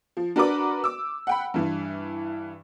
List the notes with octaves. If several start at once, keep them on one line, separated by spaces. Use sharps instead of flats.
F3
D4 F#4 A#4 B4 D5 D6
D6 E6
F#5 G5 B5
G2 E3